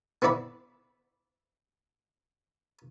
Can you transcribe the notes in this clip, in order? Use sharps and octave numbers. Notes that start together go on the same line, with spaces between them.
B3 C4 E4 D5 B5